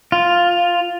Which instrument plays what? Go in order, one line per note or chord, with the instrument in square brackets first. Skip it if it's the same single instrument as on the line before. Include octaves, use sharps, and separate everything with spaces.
[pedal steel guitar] F4